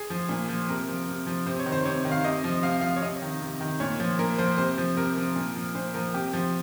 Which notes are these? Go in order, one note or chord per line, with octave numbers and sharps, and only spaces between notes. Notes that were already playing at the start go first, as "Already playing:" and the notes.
Already playing: G#4
F3
A#2
F3
C3 A#4
F3
C3
F3
C3 C5
C#5
D#3
C5
C3 C#5
D#3
F5
C3 D#5
F3
C3 F5
F3 F5
C#5
C3 D#5
D#3
C3
D#3
A#2 C#5
F3
A#2 A#4
F3 C5
C3 C5
F3
C3 A#4
F3
A#2
F3
A#2 C5
F3 A#4
C3 G4
F3